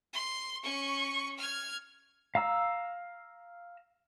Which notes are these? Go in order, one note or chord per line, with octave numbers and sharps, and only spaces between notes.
C6
C#4 C#6
F6 G#6
F5 A#5 E6